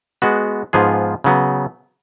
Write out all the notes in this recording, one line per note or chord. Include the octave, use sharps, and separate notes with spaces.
G#3 B3 F#4
G#2 F3 B3 F4 G#4
C#3 F#3 B3